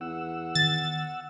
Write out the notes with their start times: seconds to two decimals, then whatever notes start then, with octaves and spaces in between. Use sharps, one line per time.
0.01 E2 F#5 E6
0.55 D#3 A6